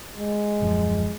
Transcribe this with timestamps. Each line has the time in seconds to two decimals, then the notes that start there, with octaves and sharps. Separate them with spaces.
0.18 G#3
0.61 D#1 F#2 F3